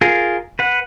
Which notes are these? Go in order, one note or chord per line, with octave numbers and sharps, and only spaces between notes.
F4 G#4 A#4
B4 F#5